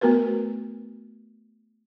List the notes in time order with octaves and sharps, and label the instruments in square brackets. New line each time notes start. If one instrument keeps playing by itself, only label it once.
[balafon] A3 B3 F#4 A#4 B4